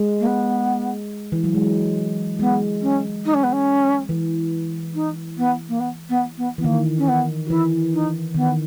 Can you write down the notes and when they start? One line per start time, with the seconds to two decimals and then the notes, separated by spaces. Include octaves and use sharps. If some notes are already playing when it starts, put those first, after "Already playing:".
Already playing: G#3
0.20 A#3
0.26 B3
1.32 E3
1.44 F#3
1.55 G#3
2.39 G#3 B3
2.82 C#4
3.25 D#4
3.34 C#4
3.43 B3
3.52 C#4
4.09 E3
4.94 D#4
5.37 B3
5.68 A#3
5.79 B3
6.09 B3
6.37 B3
6.58 E3 B3
6.64 D#3 A#3
6.98 C#4
7.08 B3
7.46 F#4
7.49 E3 E4
7.93 D#4
8.35 D#3 B3